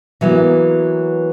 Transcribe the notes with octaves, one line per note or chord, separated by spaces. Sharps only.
E3 F#3 A#3 B3